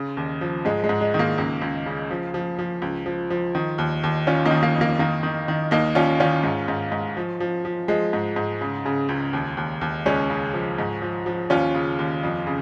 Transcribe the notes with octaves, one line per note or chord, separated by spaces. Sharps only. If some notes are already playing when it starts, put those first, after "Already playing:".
Already playing: C#3
D#2
F3
G#2 G#3
G#3
G#2
G#3
D#3
A#3
C#2
C#2
C#3
F3
F3
F3
C#2
F3
F3
D#3
D#2
D#2
D#3 C#4 F4
A#3 D#4
D#3
A#3
F2
A#3
D#3 A#3
D#3
D#3
D#2 A#3 D#4
D#2 C#4 F4
D#3 C#4 F4
G#2
G#2
G#2
F3
F3
F3
F3 G#3
G#2
G#2
C#3
C#3
C#2
D#2
D#2
D#2
C#2 G#3 C#4
C#3
F3
G#2
F3
F3
D#2 C#4 F4
C#3
D#2
F2
C#3